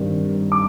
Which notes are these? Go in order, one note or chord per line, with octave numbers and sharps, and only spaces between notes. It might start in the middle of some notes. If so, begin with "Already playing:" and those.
Already playing: G2 D#3 G3 C4
D6